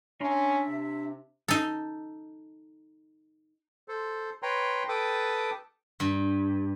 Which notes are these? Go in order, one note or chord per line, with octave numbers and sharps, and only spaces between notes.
C#4 D4 E5 A#5 C6
C3
D#4 A4
A4 C5
B4 C#5 G5 A#5 C6
A4 B4 G5 A5 D6 D#6
G2